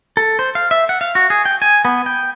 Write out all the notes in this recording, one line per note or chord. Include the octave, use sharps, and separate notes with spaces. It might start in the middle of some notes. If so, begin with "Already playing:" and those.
A4
C5
F5
E5
F#5
F5
F#4
G#4
G5
G#5
B3
G5